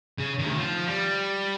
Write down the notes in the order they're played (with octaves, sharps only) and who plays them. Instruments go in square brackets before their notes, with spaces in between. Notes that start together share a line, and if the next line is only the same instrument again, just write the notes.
[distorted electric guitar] C#3
D2 D#3
F3
G3